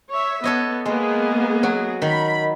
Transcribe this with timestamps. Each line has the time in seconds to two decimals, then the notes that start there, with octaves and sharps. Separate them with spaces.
0.10 C#5 E5
0.44 B3 A4 C#5 D#5
0.86 G#3 A#3 B3 G#4
1.63 F#3 F#4
2.02 D#3 B5